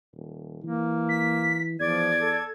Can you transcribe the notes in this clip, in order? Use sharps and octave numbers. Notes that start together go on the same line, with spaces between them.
D#1
E3 A#3
B6
E2 F3 D5 G#6
A4